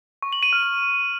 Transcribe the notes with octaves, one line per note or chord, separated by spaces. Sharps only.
C#6
F#7
D#7
F6
F6